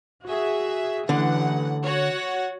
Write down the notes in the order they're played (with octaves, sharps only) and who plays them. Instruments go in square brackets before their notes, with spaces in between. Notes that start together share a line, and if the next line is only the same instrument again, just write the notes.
[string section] F#4 G#4 E5
[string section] A1 E3 F#5 [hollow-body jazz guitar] D3
[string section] F#4 C#5 F#5